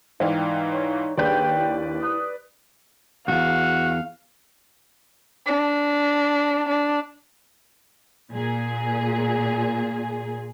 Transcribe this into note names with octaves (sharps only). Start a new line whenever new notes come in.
G#2 E3 D#4 D5 F5 G5
C#5
D#2 D4 G#4 B4 D5 G5 G6
E4
D#6 F#6
B1 E2 F#4 F5
D4
D4
A#2 G#4